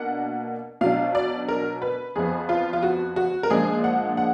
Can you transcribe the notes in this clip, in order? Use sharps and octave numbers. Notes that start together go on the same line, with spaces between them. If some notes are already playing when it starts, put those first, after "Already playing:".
Already playing: B2 A#3 D4 F#5
B2 F#3 D4 F5
D5
A#4
B4
F2 F3 B3 G#4
F4
F4
F#4
F#4
A#4
A#2 F3 G#3 D4 G#4
F#5
F#5